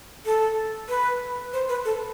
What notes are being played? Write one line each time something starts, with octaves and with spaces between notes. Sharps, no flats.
A4
B4
C5
B4
A4